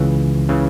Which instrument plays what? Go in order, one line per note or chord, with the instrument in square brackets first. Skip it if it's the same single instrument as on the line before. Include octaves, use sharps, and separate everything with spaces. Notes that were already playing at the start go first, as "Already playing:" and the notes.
Already playing: [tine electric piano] C#2 C#3 E3
C#3 E3